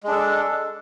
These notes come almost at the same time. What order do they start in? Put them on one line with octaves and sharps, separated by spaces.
G#3 D4 A4